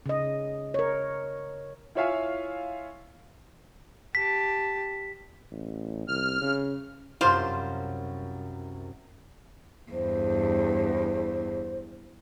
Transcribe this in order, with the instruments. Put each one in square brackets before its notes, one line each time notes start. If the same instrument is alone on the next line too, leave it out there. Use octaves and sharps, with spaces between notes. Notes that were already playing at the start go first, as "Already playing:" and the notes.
[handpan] C#3 D#5
A#4 C#5
[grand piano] E4 F4 C#5 E5 F5 G#5
[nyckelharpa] G4 A5 [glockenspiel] B6
[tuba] A1
[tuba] C2 [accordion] F6
[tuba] C#3
[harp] C2 F#2 [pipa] G3 F4 C5
[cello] E2 G2 [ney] C5